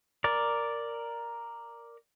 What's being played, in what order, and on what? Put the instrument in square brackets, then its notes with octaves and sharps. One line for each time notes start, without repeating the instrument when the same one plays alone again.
[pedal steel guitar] A#4 D5